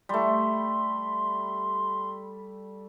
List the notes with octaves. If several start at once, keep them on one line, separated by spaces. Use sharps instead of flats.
G3 A3 C6